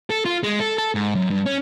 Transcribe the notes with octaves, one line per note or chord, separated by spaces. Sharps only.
A4
F4
G#3
A4
A4
G#2
F#2
G2
C#4